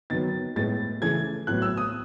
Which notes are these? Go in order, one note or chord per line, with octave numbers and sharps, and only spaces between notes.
D#3 F#3 B3 A6
A2 G#3 B3 A6
C#3 E3 A3 G#6
A2 F#3 B3 F#6
E6
D#6